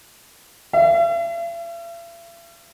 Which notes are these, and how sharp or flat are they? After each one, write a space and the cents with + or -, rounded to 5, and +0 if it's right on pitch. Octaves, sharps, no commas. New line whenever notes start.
E5 +45